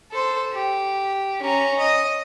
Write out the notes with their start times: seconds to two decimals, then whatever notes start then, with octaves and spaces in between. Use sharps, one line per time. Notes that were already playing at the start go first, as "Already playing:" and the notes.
0.12 A4 C5
0.53 G4
1.42 C#4 A#5
1.78 D#5